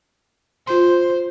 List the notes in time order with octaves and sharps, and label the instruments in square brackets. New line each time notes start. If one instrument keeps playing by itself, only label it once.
[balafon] F4 C6 [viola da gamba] C5